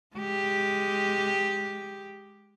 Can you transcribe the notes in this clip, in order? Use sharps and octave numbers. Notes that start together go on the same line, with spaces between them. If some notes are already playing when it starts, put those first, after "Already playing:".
G#3 G4